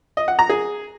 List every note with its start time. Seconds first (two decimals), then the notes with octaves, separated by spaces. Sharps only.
0.17 D#5
0.28 F#5
0.39 A#5
0.49 G#4